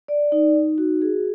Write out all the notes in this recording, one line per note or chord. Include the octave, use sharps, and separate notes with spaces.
D5
D#4
D#4
F#4
G#4